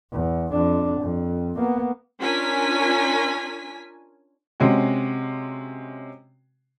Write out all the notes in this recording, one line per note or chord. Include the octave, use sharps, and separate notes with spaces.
E2
F2 D4
F2
A#3 B3
C#4 D4 F4 A#4 G#5 B6
C3 G#3 C#4 F#4